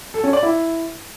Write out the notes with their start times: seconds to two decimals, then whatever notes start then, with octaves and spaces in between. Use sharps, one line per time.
0.14 A4
0.24 C#4
0.33 D5
0.43 E4